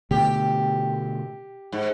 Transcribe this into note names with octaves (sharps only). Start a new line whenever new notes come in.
B2 D3 A3 G4
G#2